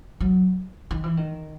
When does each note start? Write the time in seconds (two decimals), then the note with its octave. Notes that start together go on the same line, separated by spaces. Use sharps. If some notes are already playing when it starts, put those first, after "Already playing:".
0.20 F#3
0.91 D#3
1.04 E3
1.17 D#3